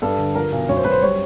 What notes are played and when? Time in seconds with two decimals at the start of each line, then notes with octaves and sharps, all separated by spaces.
0.02 G2 A4
0.18 D3
0.35 F3 A#4
0.52 B1
0.69 F#2 C#5
0.77 C5
0.84 F#2 B4
0.92 C5
1.02 G3 C#5